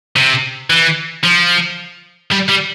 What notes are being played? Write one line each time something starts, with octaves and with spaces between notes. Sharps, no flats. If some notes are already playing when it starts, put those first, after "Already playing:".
C3
E3
F3
G3
G3